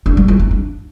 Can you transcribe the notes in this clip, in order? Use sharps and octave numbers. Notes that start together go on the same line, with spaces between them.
D4
G3
F4
D#4
D4